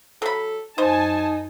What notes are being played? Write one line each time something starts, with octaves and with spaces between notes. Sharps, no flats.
F#3 A4 B5
F#2 D#4 C5 G#5 A5